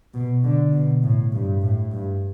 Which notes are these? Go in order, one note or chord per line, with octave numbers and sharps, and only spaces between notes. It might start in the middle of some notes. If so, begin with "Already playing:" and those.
B2
D3
B2
A2
G2
A2
G2